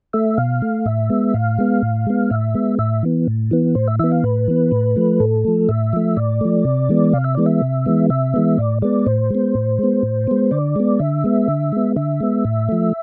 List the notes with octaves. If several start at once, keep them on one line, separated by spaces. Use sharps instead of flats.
A3 E5
B2 F5
A3
A2 E5
G#3 B3
A2 F5
G#3 B3
A2
G#3 B3
A2 E5
G#3 B3
A2 E5
E3 B3
A2
E3 B3
A2 C5
E5
E3 B3 E5
F5
A2 B4
E3 B3
A2
F3 A3
A2 A4
F3 A3
A2 E5
F3 A3
A2 D5
F3 A3
C3
E3 G#3 B3
C3 F5
E5
E3 G#3 B3 D5
E5
C3
E3 G#3 B3
C3 E5
E3 G#3 B3
A2 D5
G#3 B3 D5
A2 C5
G#3 B3
A2
G#3 B3
A2
G#3 B3
D3 D5
G#3 B3
D3 E5
G#3 B3
D3
G#3 B3
D3 E5
G#3 B3
A2
F3 A3